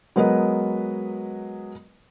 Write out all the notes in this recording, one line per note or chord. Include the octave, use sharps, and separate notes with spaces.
F#3 G#3 B3 A#4 B4 D#5